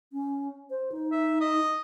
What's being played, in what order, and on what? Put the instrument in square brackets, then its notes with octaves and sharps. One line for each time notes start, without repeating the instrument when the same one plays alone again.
[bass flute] C#4
C5
D#4
[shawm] E5
D#5